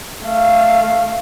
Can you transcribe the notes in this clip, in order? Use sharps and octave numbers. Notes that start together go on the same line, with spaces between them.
A3 F5